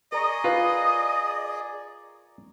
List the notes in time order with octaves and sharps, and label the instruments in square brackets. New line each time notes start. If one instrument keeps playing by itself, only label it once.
[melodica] G#4 D5 [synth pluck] A#4 A#5 C#6 [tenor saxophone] D#5
[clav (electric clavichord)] F4 B4